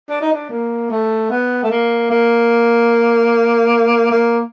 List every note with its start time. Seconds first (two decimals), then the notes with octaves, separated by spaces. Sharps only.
0.10 D4
0.21 D#4
0.33 D4
0.50 A#3
0.90 A3
1.30 B3
1.63 A3
1.70 A#3
2.10 A#3
4.11 A#3